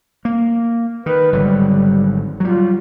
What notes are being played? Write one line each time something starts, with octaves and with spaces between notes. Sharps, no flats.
A#3
D#3 B4
G#1 D3 F#3 G3
F#3 G3 F4